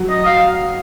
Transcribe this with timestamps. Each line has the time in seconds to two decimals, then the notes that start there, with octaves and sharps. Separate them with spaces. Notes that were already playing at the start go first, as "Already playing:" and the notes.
Already playing: F#3
0.10 D#5
0.26 F5